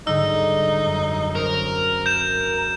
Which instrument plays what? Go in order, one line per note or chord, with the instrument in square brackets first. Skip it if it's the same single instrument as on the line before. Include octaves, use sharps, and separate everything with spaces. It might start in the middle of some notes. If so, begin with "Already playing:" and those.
[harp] G#2 D3 G3 [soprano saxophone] D#4 [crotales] E6
[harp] F#2
[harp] C#4 C5 [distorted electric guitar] A#4
[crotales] G6 E7